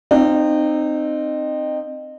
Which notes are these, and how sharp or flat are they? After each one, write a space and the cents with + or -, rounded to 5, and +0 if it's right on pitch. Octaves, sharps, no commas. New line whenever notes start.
C4 +0 D#4 -25 F5 +0